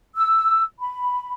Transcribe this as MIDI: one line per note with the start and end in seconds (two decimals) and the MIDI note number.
0.17 0.62 88
0.80 1.33 83